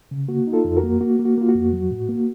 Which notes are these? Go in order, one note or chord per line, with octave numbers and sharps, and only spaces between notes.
C#3
A#3 F#4
D#4
F4 A4
F2
F#4 A#4
A#3
A#3 F#4
A#3
F#4
A#3 F4
F#4
F2
F#3
A2
A#3